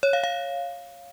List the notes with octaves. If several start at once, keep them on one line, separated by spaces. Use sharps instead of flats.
C#5
F5
F5